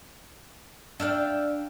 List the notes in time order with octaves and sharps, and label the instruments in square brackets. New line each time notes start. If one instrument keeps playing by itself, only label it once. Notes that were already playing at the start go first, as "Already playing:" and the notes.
[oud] D4 [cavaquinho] E5 F5 G5